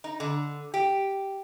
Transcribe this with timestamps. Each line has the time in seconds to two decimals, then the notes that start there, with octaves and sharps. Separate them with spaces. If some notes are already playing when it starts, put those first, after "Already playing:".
0.04 D#4
0.20 D3
0.74 G4